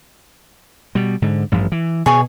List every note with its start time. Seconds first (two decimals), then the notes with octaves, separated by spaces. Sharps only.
0.95 B2 G3
1.22 G#2 D3
1.52 A1 G2 F3
1.72 E3
2.06 B2 G#4 C#5 G#5